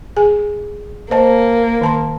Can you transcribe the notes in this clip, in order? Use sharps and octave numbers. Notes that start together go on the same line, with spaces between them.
G#4 G#5
A#3 C5 D#5 A5
D#3 A5 C6